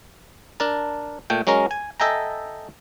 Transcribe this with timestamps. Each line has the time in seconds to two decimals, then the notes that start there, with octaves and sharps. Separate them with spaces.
0.60 D4 A#4 A5
1.30 A#2 A3 G5
1.47 F#3 G#3 C#4 A#4 A#5
1.71 G#5
2.00 A4 D#5 E5 G5 G#5 A#5